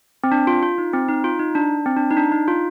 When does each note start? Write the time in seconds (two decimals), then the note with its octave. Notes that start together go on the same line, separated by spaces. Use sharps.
0.24 C4
0.32 D4
0.47 F4
0.63 F4
0.78 D#4
0.93 C4
1.08 D#4
1.24 F4
1.39 D#4
1.55 D4
1.86 C4
1.96 D4
2.11 D#4
2.16 D4
2.32 D#4
2.48 F4